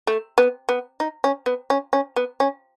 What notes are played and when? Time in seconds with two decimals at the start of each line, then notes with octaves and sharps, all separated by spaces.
0.07 A3
0.38 B3
0.69 B3
1.00 D#4
1.24 C#4
1.46 B3
1.70 C#4
1.93 C#4
2.16 B3
2.40 C#4